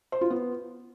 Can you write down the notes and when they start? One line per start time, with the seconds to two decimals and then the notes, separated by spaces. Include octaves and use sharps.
0.12 C5
0.21 F4
0.30 B3